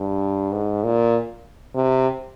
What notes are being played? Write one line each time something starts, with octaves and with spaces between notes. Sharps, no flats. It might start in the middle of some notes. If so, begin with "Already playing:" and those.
Already playing: G2
G#2
A#2
C3